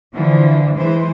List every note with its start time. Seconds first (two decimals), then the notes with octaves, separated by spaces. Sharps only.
0.14 D3 E3 F3
0.75 E3 G#3 C5